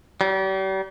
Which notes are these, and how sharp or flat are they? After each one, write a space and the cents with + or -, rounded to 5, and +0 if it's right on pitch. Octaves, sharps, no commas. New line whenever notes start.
G3 -40